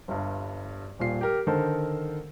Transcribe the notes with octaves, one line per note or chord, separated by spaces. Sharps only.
G1 G2
D#1 A#2 C7
G4 A#4
D3 D#3 A4 A#4 C5